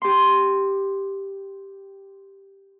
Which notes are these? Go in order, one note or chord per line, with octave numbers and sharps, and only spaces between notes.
G4 C6